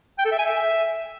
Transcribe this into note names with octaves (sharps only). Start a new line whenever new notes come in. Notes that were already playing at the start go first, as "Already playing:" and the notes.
G5
A4
E5
G#5
E5